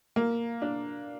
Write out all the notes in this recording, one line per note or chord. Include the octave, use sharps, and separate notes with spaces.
A#3
D4